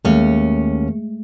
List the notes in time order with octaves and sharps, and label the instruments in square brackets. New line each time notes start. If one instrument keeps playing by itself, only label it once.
[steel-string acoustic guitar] D#2 C#4 [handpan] G#3 A3